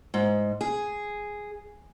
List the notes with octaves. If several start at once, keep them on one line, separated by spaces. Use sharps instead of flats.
G#2
G#4